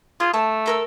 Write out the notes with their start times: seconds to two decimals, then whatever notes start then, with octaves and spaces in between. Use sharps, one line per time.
0.20 F4 G#4 D#6
0.34 A3 A5
0.66 A4 A#4 E6